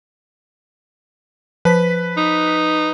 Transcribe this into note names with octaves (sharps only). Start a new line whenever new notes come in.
F3 B4 B6
D#4